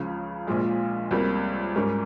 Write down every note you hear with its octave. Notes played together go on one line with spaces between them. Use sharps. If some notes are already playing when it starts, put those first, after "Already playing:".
Already playing: C#2 C#3 F3
A#1 A#2 F3 G#3
C#2 C3 G3 A#3
G#2 G3 C#4 G4 A#4